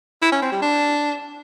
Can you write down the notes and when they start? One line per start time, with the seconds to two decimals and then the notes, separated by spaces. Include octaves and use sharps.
0.22 E4
0.32 C#4
0.42 C4
0.52 G3
0.62 D4